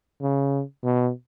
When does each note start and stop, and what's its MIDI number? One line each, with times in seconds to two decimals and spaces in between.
0.22 0.63 49
0.84 1.11 47